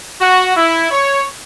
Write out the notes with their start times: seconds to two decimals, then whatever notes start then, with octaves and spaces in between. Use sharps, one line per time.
0.20 F#4
0.55 E4
0.90 C#5